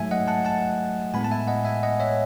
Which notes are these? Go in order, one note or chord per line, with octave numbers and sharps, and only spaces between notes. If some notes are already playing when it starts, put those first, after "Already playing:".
Already playing: G#2 F#3 A3 E5 G#5
D#5 F#5
F#5 A5
F#5 A5
A2 G#3 B3 G#5 B5
A5
E5 G#5
D#5 F#5
E5 G#5
D#5 F#5
C#5 E5